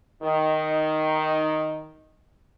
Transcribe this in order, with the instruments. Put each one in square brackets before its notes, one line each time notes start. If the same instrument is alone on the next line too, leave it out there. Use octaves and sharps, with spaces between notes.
[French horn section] D#3 D#4